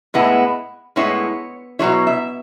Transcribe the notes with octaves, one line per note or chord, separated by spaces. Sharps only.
A2 G#3 B3 E4
A2 G#3 B3 E4 C#5
B2 F#3 A3 E4 C#5
E5